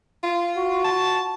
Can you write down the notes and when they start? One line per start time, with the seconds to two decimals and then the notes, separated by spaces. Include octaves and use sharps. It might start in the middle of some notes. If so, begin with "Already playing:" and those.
0.23 F4
0.57 F#4
0.84 A5